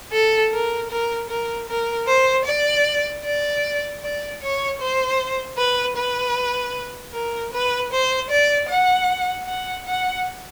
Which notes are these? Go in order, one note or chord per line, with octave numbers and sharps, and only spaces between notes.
A4
A#4
A#4
A#4
A#4
C5
D5
D5
D5
C#5
C5
B4
B4
A#4
B4
C5
D5
F#5
F#5
F#5